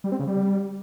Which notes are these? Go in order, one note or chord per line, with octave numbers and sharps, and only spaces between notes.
G3
C4
C#3
G3